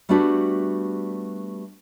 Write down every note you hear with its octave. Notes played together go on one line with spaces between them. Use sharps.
G3 A3 B3 D4 F#4 G4